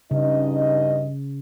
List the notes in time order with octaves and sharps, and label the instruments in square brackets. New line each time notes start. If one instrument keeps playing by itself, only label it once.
[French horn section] G2 D#4 D#5 [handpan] C#3